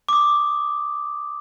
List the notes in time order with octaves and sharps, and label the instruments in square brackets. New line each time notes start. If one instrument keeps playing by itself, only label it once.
[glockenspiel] D6 D#6